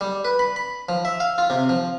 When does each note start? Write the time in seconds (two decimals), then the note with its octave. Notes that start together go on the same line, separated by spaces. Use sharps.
0.01 G3
0.25 B4
0.39 B5
0.56 B5
0.89 F3
1.05 E5
1.20 F5
1.38 F4
1.50 C3
1.69 F3